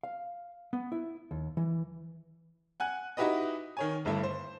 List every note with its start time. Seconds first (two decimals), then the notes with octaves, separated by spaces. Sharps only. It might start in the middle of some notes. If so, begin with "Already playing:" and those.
0.03 F5
0.73 B3
0.92 E4
1.31 D#2
1.57 E3
2.80 F#5 G#5 F#6
3.17 D#4 E4 F#4 G4 B4 D#5
3.77 D#3 C#5 G#5
4.05 G1 G2 A3 E4
4.23 C5